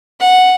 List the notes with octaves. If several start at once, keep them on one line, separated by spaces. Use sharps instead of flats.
F#5